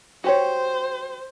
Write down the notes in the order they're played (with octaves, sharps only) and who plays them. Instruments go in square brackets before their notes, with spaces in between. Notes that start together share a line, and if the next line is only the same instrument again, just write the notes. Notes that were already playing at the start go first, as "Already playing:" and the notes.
[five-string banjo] F#4 G4 C#5 [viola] C5